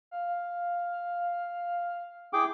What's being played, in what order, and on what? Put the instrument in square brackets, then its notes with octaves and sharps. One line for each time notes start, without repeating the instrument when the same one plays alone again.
[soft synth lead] F5
[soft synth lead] E4 [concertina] G#4 G5 D6